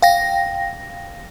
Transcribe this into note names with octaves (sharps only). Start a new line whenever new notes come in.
F5 G5 A#6